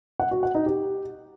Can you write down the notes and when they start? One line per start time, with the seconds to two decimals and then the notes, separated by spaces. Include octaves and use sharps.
0.20 F#5
0.31 F#4
0.43 F#5
0.55 D#4
0.66 G4